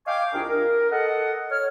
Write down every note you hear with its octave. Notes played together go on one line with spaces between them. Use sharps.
D#5 F5 G5 G#5 C#6 D6
C2 D4 F4 G#4 A#4 G5
A#4
A4 D#5 F#5
C#5 F6